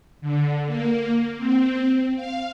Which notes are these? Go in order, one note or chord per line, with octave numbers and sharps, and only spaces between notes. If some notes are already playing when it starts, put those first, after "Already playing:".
D3
A#3
C4
F5